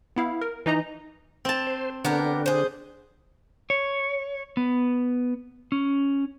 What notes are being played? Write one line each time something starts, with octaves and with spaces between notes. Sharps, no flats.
B3 E4 F5
A#4
E3 D#4 D#5 A#5
C4 A5
C5
D3 B3 D4 G4 A#4
G#4 C5
C#5
B3
C#4